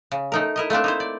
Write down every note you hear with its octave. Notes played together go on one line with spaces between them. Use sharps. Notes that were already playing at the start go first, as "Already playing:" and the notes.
C#3
A3 D#4 A#4
E4 A#4 D#5
A3 A#3 C4 D4
D#4 E4 C5
D5